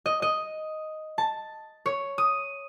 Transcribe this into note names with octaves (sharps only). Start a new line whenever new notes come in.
D#5
D#5
A5
C#5
D#6